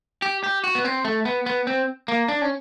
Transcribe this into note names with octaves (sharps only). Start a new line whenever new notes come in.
G4
G4
F#4
B3
C4
A3
B3
B3
C4
A#3
D4
C#4